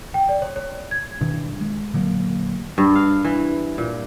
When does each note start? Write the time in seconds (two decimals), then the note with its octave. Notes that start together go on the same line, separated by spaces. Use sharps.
0.14 G5
0.29 D5
0.42 C#5
0.56 C#5
0.91 G#6
1.21 G2 B2 D#3 E3
1.61 G#3
1.94 A#2 D3 F#3 A#3
2.78 G2
2.96 F5
3.25 E3
3.78 A#2